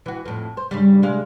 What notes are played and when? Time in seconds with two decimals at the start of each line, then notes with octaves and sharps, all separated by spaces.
0.06 E3 F#4
0.26 F2 A2
0.57 C5
0.71 G2 C#3 G3
1.02 C3 G#3 F5